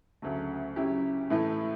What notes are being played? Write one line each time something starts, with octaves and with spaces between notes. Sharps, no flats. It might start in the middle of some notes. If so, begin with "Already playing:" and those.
D2 C#3 F#3 A3
C#3 F#3 C#4 E4 G4
A2 E3 A3 E4